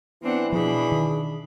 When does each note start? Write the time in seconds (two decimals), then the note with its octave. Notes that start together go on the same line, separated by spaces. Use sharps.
0.23 E3 B3 C4 D4 F#5
0.52 B2 F3 D4 G#4 B5
0.92 D#3